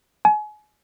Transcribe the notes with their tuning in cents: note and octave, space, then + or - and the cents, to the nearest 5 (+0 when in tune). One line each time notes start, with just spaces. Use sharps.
G#5 +35